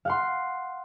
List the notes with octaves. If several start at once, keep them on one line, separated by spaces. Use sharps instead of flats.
F5 F#5 C6